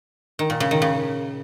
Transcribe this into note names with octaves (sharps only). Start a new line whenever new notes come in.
D#3
A#2
C#3
D#3
C#3